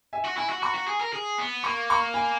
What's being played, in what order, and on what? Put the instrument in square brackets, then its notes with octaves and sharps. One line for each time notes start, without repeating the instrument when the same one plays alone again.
[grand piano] E5 G#5
[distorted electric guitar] F#4
[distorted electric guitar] E4 [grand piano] G#5 B5
[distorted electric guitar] F#4
[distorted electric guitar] F#4 [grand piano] A#5 C#6
[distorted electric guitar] F#4
G#4
A#4
G#4
B3
[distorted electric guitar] A#3 [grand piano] C#6
[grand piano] A#5 C#6
G#5 B5